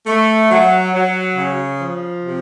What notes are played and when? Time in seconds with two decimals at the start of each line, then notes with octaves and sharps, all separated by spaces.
0.07 A3
0.51 F#3
0.94 F#3
1.37 C#3
1.79 F3
2.24 C3